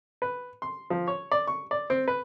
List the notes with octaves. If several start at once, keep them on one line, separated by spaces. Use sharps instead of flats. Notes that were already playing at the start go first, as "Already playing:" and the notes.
B4
C6
F3
C#5
D5
C#6
D5
C4
B4